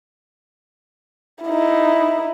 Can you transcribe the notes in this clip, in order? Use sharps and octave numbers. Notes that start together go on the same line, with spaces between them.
D#4 E4